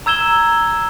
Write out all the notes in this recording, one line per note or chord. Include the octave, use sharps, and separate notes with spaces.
A#5 E6 G#6 E7 G7